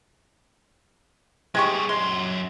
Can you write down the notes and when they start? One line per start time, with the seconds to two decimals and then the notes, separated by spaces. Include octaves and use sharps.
1.55 G3 G#3 G4 G#4 C#6
1.89 F#2 G#3 C6